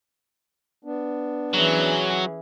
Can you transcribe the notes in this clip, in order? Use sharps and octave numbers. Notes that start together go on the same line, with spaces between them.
B3 D4
E3 F#3 C#4 G#4